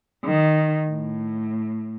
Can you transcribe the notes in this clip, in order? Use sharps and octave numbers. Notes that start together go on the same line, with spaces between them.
D#3
A2